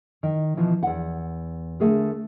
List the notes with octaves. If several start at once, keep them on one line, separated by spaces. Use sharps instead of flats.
D#3
B2 E3 F3
E2 F#5
D3 A3 G#4 A#4